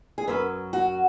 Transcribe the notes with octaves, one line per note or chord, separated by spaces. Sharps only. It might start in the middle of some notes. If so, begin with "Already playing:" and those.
G#4
F#2 F#3 C#4 B4
F#4